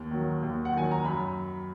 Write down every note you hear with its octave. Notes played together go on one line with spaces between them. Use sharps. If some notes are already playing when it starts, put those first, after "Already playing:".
Already playing: D#2
D#3 F#3
D#2
F#5
D#3 F#3 G#5
A#5
F#2 B5